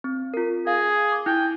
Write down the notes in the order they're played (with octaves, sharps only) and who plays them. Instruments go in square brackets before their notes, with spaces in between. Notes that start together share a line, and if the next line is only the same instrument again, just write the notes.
[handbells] C4
F4 A#4
[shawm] G#4 [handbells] F5
[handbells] D6
[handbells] E4 [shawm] G5